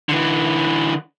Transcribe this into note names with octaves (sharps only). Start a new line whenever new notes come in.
D3 E3